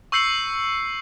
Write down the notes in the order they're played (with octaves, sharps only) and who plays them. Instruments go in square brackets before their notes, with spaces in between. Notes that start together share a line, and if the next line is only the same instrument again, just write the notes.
[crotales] C#6 E6 G6 C7 C#7 F#7